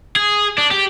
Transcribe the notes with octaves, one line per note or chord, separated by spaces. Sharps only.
G#4
D4
G4